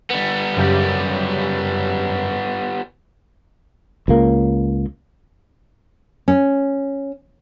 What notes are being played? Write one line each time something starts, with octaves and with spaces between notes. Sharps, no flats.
G3 B3
F#2 C#3 G4
C#2 A#3
C#4